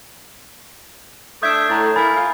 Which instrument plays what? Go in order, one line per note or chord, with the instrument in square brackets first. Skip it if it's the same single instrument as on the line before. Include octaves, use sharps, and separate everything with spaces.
[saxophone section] A3 D4 E5 [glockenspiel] D#6 G6 G#6
[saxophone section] A2 [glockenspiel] A#5 A6
[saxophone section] A#3 E4 A#4 [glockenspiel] G#5 B5 A6
[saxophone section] F4